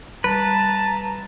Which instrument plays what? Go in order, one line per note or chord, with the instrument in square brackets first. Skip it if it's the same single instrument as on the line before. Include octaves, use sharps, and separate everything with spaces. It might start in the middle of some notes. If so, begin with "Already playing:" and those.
[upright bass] G3 [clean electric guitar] B4 [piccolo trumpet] A5 [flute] A#5